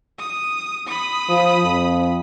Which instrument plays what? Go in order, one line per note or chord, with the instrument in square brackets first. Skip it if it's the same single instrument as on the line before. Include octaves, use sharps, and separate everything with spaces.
[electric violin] D#6
B5 D#6
[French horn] F3
F2